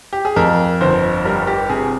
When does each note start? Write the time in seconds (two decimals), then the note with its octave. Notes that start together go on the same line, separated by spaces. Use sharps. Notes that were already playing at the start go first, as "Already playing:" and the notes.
0.13 G4
0.25 G#4
0.36 F2 A#4
0.81 G1 C5
1.25 G3 A#4
1.47 G4
1.69 C3 G#4